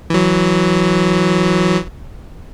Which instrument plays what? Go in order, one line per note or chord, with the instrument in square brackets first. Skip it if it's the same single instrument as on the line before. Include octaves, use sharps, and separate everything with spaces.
[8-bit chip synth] E3 F#3